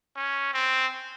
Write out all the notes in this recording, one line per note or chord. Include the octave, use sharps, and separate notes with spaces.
C#4
C4